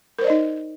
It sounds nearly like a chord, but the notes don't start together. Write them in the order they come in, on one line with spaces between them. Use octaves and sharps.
A#4 C5 D5 D#5 D#4